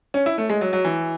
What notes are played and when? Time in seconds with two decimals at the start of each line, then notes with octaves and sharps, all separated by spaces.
0.14 C#4
0.26 E4
0.38 A3
0.50 G#3
0.61 F#3
0.73 F#3
0.85 E3